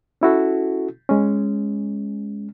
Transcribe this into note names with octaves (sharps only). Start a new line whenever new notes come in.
C#4 E4 F#4 A4
G#3 C#4